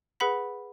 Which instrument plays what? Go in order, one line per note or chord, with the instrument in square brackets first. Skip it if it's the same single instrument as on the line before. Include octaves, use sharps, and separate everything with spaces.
[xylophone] G#4 B4 F#5 B5 B6